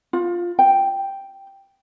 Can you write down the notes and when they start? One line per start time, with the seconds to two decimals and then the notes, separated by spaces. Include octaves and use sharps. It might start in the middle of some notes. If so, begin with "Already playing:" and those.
0.13 F4
0.59 G5